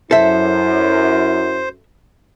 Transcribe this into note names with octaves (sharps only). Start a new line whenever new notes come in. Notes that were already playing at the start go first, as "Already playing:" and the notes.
F#2 E4 A4 C5 E5